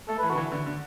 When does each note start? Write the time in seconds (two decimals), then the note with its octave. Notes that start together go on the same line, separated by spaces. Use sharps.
0.08 A3 A4
0.19 E3 B4
0.29 D3 F#4
0.37 E3
0.52 D3
0.66 D3